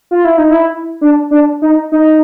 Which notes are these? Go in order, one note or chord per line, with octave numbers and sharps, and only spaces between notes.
F4
E4
D#4
E4
D4
D4
D#4
D#4